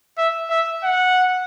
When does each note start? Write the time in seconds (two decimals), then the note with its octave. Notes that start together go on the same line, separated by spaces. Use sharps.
0.18 E5
0.50 E5
0.83 F#5